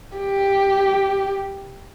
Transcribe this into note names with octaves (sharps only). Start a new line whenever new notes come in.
G4